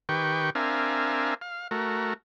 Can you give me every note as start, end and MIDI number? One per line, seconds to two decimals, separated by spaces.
0.09 0.50 51
0.09 0.50 67
0.09 0.50 71
0.09 0.50 79
0.09 0.50 85
0.55 1.34 60
0.55 1.34 62
0.55 1.34 70
0.55 1.34 76
0.55 1.34 77
0.55 1.34 80
1.41 1.68 77
1.71 2.14 57
1.71 2.14 66
1.71 2.14 70